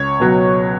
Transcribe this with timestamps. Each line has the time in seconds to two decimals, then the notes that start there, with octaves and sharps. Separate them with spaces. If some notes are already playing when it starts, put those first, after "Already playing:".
Already playing: C#2 C#5
0.20 B2 F#3